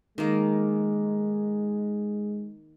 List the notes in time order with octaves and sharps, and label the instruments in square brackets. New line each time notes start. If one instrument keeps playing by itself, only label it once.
[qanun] D#3 A#3 [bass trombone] G#3